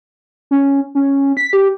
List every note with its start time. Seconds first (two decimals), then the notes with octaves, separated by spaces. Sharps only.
0.51 C#4
0.95 C#4
1.37 B6
1.53 G4